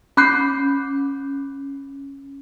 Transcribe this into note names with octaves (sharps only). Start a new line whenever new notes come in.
C#4 B5 D6 F#6 G6 C7